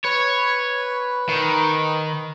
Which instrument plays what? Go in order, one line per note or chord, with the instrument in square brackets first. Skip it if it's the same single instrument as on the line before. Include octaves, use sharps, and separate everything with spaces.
[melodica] B4 [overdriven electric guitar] C#5
[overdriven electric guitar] D#3